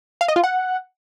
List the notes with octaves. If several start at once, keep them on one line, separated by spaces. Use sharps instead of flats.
F5
D#5
F4
F#5